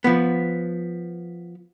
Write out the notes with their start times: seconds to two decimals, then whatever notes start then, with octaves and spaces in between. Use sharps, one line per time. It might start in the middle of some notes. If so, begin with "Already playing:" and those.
0.04 F3 B3